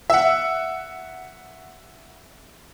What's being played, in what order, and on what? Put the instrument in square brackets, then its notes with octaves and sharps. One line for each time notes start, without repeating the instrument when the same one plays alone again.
[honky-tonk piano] E5 F#5